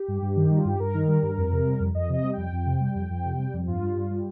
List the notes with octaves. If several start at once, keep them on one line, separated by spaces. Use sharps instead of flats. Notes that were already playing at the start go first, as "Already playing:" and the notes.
Already playing: G4
G2
G2
D#3
G3 D#4
F4
G2 G4
G2 A#4
D#3
G3
G2
F2
C3
G3
F2
F2 D#5
C3 D#5
G3
F2 G5
F2
C3
G3
F2
F2
C3
G3
F2
G2 F4
G3
G2
G3